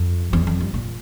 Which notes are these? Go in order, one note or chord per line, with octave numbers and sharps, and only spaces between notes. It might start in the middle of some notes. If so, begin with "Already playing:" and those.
Already playing: F2
E2
F2
G2
A#2